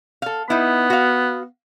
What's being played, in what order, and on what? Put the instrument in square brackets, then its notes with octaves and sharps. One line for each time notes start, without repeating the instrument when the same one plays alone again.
[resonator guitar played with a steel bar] A4 F5
[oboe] B3 [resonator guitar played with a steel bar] D#4 E4
[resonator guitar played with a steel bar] F#4 F5